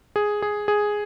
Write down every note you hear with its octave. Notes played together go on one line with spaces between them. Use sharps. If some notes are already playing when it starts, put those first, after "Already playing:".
G#4
G#4
G#4